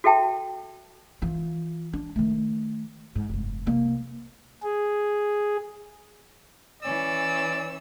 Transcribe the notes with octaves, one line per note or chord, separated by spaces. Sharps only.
F#4 A4 E5 G5 A5
E3 F4
D4
D#3 A3
G#2
F1 G2
C2 A#3
G#4
E3 C#4 D5 E6